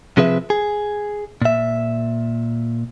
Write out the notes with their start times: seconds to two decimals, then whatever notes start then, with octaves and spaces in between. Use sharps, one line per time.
0.17 C3 F3 C4 G#4 B4 E5
0.50 G#4
1.42 A#2 E5